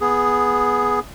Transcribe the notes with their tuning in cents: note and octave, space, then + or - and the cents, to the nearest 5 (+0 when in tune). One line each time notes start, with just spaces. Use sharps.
B3 -5 G#4 +0